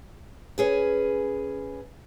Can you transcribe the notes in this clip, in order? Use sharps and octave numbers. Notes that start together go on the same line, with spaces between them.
C#4 G#4 B4